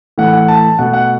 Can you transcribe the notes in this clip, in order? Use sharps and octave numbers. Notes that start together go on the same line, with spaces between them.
A2 E3 A3 F#5
F#5
A5
B2 A3 F#5
F#5